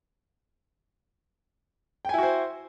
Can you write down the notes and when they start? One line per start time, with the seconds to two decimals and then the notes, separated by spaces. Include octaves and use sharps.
2.05 G5
2.09 G#5
2.14 E4
2.18 F#4
2.23 C5